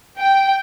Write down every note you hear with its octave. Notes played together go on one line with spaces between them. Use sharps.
G5